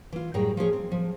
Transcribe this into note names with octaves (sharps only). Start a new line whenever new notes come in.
E3 F4
F#2 A2 G3 G#4 G5 A#5
F3 C#4 G#4 C#5
C4
F3